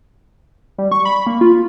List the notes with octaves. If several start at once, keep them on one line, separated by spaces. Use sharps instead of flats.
G3
C#6
B5
A#3
F4